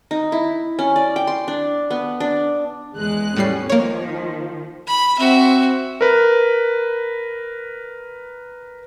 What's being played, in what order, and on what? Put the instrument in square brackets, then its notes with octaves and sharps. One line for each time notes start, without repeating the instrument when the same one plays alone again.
[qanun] D#4
E4
C#4
D5
G5
C6
D4
B3
D4
[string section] E2 G#3 F#6
[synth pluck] A2 G3 C7 [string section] C#4
[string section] D#3 F3 [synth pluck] A#3 C#5
[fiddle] B5
[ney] C4 [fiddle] F#4 E5
[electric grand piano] A#4 B4